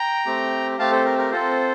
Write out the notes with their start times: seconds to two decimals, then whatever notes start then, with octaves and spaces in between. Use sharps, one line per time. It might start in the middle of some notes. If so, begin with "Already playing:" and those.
Already playing: G5 A#5
0.26 A3 C4 G4
0.79 A3 C4 G4 F5 A5
0.91 A4 C5
1.05 A#4
1.18 A#4
1.31 C4 F4 A4 C5